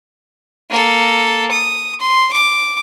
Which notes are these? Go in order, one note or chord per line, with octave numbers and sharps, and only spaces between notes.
A#3 A4
D#6
C6
D6